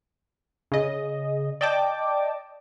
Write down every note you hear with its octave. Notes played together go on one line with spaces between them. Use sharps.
C#3 D#5
D5 D#5 G5 A5 D6